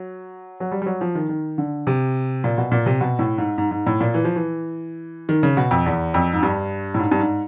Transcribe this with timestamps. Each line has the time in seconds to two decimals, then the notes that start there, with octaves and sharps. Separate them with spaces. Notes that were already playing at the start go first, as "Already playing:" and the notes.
Already playing: F#3
0.60 F#3
0.72 G3
0.82 G3
0.86 F#3
1.01 F3
1.15 D#3
1.29 D#3
1.58 D3
1.87 C3
2.44 A#2
2.58 B2
2.72 A#2
2.86 C3
3.01 B2
3.19 A2
3.38 G#2
3.58 G#2
3.71 G#2
3.86 A2
4.00 A#2
4.14 E3
4.25 F3
4.36 E3
5.29 D#3
5.43 C#3
5.57 B2
5.71 F2
5.86 E2
6.14 F2
6.33 G#2
6.43 G2
6.94 A2
6.99 G#2
7.11 G2
7.19 G#2